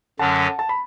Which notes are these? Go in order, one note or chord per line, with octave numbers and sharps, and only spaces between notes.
F#2 D3 F#3 C#4 F#5 A5
A5
B5